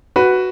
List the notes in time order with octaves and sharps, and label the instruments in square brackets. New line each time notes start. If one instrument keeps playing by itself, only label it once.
[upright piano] F#4 B4